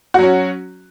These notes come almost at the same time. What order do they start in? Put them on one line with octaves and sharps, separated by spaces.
F#4 F#3 C#4